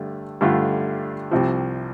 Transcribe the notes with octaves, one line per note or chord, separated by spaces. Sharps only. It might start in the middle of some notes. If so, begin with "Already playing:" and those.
Already playing: G2 D3 A3
G2 D3 A3 F4
C2 C3 F3